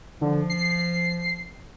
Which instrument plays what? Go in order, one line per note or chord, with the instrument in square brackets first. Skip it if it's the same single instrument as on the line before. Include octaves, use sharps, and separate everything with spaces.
[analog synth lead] D3 [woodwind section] F3
[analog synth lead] C7